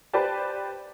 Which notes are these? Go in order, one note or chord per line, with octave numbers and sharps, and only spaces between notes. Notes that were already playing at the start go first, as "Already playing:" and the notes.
G4 B4 C5 D5 A5